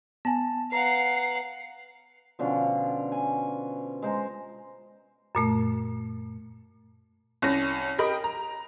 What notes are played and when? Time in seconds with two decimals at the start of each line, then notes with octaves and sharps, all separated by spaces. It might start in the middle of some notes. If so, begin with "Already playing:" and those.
0.25 B3 G#5 A5
0.72 B4 F5 F#5 A#5 C7
2.39 B2 D3 F3 C#4
3.12 G#5
4.02 G#3 C5 A#5
5.35 F#2 A#2 A3
7.42 C2 C#4 A#6
7.98 G4 A#4 D#5 G5 B5
8.24 A#5